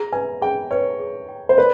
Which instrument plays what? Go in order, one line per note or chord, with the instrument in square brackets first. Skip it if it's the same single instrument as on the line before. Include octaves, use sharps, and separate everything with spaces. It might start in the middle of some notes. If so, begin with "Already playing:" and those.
Already playing: [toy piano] G#4 [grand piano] A#5
[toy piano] B4 [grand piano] G#5
[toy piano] G#4 [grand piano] G5
[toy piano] B4 [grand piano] C#5
[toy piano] G#4
G5
[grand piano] C5
[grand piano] B4 [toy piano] D5